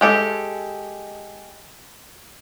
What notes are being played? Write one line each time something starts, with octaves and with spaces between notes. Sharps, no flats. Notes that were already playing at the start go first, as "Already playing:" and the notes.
G#3 G4 A4